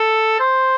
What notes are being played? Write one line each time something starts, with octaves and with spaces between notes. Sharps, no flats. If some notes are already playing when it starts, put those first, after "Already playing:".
Already playing: A4
C5